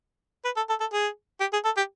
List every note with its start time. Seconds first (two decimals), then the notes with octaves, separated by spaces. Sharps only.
0.45 B4
0.57 A4
0.70 A4
0.81 A4
0.93 G#4
1.40 G4
1.53 G#4
1.65 A4
1.77 G4